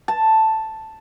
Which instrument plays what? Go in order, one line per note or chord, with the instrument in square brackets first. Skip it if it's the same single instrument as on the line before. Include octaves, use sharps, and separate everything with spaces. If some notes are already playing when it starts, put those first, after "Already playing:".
[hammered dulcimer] A5